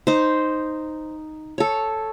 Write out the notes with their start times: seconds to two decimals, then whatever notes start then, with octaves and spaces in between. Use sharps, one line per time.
0.07 D#4 C5
1.58 A4 C#5